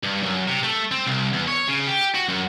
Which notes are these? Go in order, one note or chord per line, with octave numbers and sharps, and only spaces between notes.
G2
F#2
C3
A3
C4
C2
E2
C#5
C#3
G4
F#4
F#2